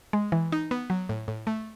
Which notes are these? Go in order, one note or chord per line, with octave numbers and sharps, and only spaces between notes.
G#3
E3
D#4
B3
F#3
A2
A2
A3